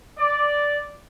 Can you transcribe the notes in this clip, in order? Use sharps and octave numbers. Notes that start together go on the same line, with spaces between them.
D5